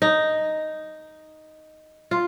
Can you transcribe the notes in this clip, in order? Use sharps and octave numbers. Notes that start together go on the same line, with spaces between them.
D#4
F4